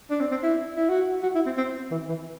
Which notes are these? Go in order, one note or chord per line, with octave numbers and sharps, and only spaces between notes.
D4
C4
C4
E4
E4
F#4
F#4
E4
C4
C4
E3
E3